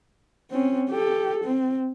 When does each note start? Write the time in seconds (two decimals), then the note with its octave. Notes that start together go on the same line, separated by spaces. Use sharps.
0.51 C4 C#4
0.90 G4 A4
1.45 C4